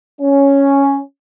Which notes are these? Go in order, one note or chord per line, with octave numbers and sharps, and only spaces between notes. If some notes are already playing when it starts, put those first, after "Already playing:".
C#4